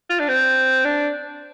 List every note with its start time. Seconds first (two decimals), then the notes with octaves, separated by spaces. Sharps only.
0.10 F4
0.19 D4
0.28 C4
0.85 D4